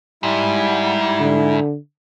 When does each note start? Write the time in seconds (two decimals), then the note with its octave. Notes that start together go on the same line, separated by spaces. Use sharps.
0.23 G#2 G3 E4
1.20 D3